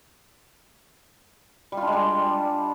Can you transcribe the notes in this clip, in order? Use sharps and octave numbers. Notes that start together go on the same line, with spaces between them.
G3
F4
D4
G#3
G3